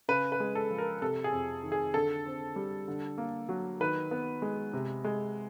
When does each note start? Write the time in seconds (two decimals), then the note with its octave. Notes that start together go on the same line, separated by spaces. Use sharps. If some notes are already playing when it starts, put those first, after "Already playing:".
0.08 C#3 B4
0.32 B4
0.40 G#3
0.55 A4
0.70 F3
0.78 A#4
1.02 C3 A4
1.24 G#4
1.32 F2
1.63 D#3
1.72 G#4
1.94 D3 A4
2.26 C4
2.56 G3
2.88 D3
3.18 A#3
3.49 F#3
3.80 D#3 B4
4.11 B3
4.42 G#3
4.73 C3
5.04 G#3